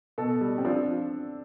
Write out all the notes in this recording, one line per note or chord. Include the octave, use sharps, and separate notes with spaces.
B2 A4
G3
C4
F3 D4